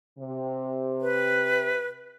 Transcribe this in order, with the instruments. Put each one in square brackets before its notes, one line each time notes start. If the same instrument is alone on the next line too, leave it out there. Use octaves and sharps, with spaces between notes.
[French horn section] C3
[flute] B4